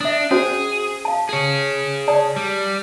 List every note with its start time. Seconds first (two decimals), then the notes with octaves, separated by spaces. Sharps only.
0.01 D4 E5 D#6
0.31 C#4 F#4 G#4 C5
1.05 F5 A5
1.29 G#4 C#5
2.08 D5 A5 D#6
2.36 G3